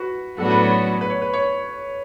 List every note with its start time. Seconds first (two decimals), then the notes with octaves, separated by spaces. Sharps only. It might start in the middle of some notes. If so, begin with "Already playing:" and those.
Already playing: F#4 B4
0.38 A2 F#3 B3 D4 F#4 A4
0.50 B4
0.62 C#5
1.01 B4
1.10 C#5
1.22 B4
1.34 C#5